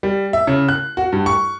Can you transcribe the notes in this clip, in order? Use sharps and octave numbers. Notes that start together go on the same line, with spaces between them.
G3
E5
C#3
F#6
F#4
G2
C#6